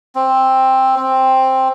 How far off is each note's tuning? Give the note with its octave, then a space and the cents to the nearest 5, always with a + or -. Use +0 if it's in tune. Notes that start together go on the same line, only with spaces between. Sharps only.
C4 +10
C4 +5